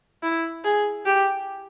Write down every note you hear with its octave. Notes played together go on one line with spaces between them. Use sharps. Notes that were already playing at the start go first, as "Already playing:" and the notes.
E4
G#4
G4